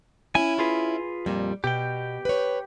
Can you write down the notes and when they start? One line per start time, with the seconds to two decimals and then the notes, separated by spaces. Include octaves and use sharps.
0.35 C#4 E4 G#5
0.59 F4 G#4 B4
1.26 F2 A#2 G3
1.64 B2 G4 G5
2.25 B4 C#5